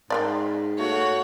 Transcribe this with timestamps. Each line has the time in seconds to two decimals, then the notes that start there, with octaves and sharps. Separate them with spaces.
0.10 G#2 C4 A#4 D5
0.78 A3 A#3 F#4 C#5 F#5